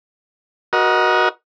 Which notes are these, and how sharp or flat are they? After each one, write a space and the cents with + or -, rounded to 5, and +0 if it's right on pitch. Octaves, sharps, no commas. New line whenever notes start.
F#4 +0 A#4 +35 D#5 +0